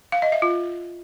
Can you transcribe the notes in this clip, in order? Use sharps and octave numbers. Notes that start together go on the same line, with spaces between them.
F5
D#5
E5
F4